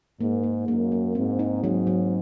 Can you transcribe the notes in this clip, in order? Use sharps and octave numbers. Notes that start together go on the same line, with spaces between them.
G#2 A#3
A#3
F#2 A#3
A#3
G#2 C4
D#4
G#2 F#3
F#3